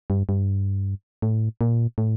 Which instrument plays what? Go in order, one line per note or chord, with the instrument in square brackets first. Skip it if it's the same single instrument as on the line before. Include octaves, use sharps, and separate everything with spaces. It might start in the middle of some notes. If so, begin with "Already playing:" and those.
[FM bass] G2
G2
A2
A#2
A2